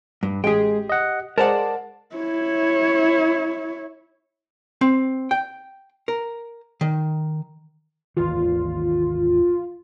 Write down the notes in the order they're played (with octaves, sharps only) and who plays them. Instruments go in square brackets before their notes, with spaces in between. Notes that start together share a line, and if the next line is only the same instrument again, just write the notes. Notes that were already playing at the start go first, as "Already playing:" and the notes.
[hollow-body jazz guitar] G2
[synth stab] A1 G#4 [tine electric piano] G#3 [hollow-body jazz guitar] G4 G5
[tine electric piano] D#5 F#5
[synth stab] G#3 D5 [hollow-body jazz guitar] A#4 C5 F#5 [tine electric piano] A5
[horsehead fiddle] E4 C#5
[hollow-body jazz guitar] C4
G5
A#4
D#3
[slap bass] G#1 D#2 E3 [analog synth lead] F4